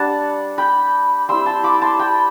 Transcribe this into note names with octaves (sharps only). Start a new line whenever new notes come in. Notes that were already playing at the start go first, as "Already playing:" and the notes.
Already playing: G3 D4 F#5 A5
G5 B5
G3 C4 E4 C6 E6
A5 C6
B5 D6
A5 C6
G5 B5